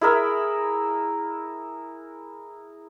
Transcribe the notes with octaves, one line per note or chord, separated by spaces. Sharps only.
E4 G#4 A#4 E5